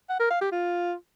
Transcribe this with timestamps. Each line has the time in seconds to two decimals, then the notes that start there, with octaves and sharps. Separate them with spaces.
0.09 F#5
0.20 A#4
0.31 F5
0.41 G4
0.52 F4